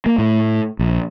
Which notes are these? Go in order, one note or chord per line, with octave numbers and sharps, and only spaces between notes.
A#3
A2
A#1